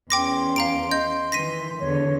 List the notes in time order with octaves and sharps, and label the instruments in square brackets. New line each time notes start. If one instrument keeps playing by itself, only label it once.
[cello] E2 C#4 [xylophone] G5 D6 A#6 [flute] C6
[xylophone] F5 A#5 D7
D#5 G6
[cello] D#3 E3 [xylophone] A#6 B6 D#7
[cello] E2 D3 [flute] C#5